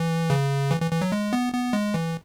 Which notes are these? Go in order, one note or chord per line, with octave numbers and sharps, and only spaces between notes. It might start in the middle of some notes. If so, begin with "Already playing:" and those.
Already playing: E3
C#3
E3
E3
E3
F#3
G#3
B3
B3
G#3
E3